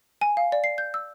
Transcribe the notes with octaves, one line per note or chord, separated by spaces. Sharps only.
G#5
F5
D5
C7
G6
E6